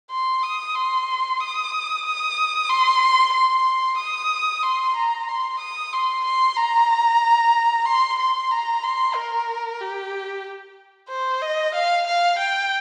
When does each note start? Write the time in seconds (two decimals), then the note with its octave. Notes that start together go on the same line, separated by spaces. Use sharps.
0.11 C6
0.43 D#6
0.75 C6
1.40 D#6
2.05 D#6
2.69 C6
3.34 C6
3.98 D#6
4.63 C6
4.96 A#5
5.28 C6
5.59 D#6
5.93 C6
6.24 C6
6.57 A#5
7.86 C6
8.19 C6
8.51 A#5
8.83 C6
9.15 A#4
9.81 G4
11.09 C5
11.41 D#5
11.74 F5
12.07 F5
12.38 G5